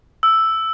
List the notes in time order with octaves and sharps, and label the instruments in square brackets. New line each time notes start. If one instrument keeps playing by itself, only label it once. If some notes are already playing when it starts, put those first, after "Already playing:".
[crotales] E6